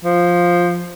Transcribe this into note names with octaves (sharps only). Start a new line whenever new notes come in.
F3